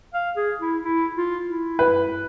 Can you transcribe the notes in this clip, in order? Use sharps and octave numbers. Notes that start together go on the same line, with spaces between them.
F5
G#4
E4
E4
F4
E4
B4